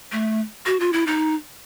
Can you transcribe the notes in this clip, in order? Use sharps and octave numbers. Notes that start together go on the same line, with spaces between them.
A3
F#4
F4
E4
D#4